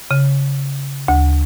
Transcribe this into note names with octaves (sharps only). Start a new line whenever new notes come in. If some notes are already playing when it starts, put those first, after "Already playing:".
C#3
D2